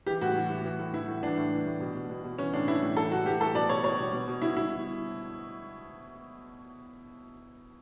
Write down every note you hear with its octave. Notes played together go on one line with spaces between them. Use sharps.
E3 G4
A2 F#4
E3
A2
E3
A2
E3 E4
A2
E3 D4
A2
E3
A2
B2
B2
B2
B2
E3 C#4
A2 D4
E3 E4
A2
E3 A4
A2 F#4
E3 G4
A2 A4
B2 D5
B2 C#5
B2 C#5
B2
B2
B2
B2 E4
B2 E4